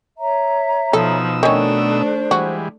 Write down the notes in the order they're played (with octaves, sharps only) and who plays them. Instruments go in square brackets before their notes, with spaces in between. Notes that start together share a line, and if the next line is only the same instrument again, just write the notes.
[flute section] C#5 E5 A#5
[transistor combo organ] B2 D#4 E6 [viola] F3 [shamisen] A4
[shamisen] D#3 C#4 [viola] A3 D4 [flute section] F#4 A4 F#5
[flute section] C5
[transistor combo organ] E3 G3 G#3 [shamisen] F#4